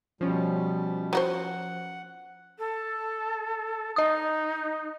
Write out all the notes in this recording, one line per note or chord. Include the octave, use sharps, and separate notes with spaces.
B2 F3 G3 C#4
F#3 F#4 C5 F#5
A4
D#4 D#5 D#6